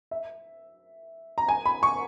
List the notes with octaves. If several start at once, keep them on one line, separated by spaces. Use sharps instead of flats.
E5
A#5
G#5
B5
C#6